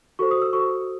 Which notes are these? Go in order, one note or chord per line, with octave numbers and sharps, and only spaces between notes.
F#4 A4 C5 C#6
D#6
E6
F#4 A4 C5 C#6